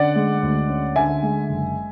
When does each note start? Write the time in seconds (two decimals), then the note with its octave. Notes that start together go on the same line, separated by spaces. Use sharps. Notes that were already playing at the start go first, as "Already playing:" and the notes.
Already playing: D3 C#4 D5 F#5
0.16 G#3
0.43 D2
0.69 C#4
0.96 D3 E5 G#5
1.23 G#3
1.49 F#1